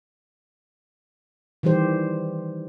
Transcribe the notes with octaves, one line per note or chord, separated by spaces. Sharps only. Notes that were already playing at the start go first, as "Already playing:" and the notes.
D#3 E3 G3 G4 C5